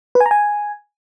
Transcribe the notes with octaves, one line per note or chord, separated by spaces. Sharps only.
B4
G#5
A#5
G#5